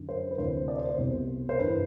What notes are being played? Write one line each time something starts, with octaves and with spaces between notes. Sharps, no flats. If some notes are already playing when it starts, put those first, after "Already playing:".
Already playing: F#2 D3
C5
B4
D2 C3 E3 C5
D5
C5
C5
C2 B2
C5
G2 E3 B4